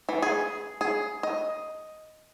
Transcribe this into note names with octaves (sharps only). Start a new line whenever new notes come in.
E3
G#4
G#4
D#5